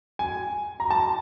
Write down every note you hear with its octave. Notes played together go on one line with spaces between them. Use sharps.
G#5
A#5
A5